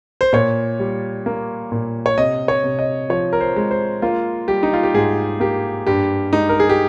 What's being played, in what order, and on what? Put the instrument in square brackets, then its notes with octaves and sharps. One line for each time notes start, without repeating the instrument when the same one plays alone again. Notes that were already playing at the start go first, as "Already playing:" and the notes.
[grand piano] C5
A#2 C#5
G3
A#3
A#2
C#5
C3 D#5
C#5
C3
D#5
F3 C#5
A#4
C5
G#3
C5
A#3 F4
G3 G4
D#4
F4
G4
G#2 G#4
A#3 G4
G2 G4
G#3 D#4
A#4
G#4
G4